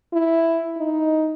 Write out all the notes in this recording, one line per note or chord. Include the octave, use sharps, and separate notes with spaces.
E4
D#4